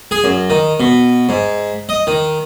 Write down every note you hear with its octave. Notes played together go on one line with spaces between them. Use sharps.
G#4
F#2
D#3
B2
G#2
D#5
D#3